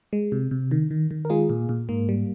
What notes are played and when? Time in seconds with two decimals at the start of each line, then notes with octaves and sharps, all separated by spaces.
0.13 G#3
0.32 C3
0.51 C3
0.71 D#3
0.91 D#3
1.11 D#3
1.25 A#4
1.30 G#3 F4 G#4
1.50 A#2
1.69 A#2
1.89 G#2 A#3
2.09 G3